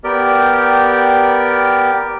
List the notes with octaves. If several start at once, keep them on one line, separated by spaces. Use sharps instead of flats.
B3 G4 A#4 D5 G5